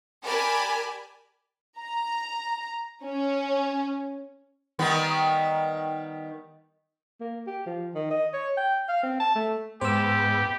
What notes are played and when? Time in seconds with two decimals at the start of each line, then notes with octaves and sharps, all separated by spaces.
0.23 G4 A#4 D5 G#5 A5 B5
1.79 A#5
3.04 C#4
4.79 D#3 G3 B3
7.20 A#3
7.47 G4
7.66 F3
7.95 D#3
8.11 D#5
8.33 C#5
8.57 G5
8.89 F5
9.03 C4
9.20 A5
9.35 A3
9.81 G#2 G#3 B3 G4 C5 E6